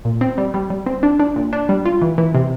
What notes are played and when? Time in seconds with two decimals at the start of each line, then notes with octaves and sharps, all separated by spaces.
0.05 A#2
0.21 C4
0.38 G3
0.54 G3
0.70 G3
0.86 C4
1.03 D4
1.20 D4
1.36 A#2
1.53 D4
1.69 G3
1.86 F4
2.02 E3
2.18 E3
2.34 C3